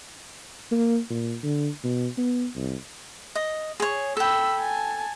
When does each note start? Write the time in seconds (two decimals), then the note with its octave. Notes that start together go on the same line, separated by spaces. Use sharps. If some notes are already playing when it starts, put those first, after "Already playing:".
0.72 A#3
1.10 A#2
1.43 D3
1.84 B2
2.18 B3
2.56 C2
3.35 D#5
3.80 G#4 C#5
4.17 A4 G5 B5 E6
4.60 G#5 A5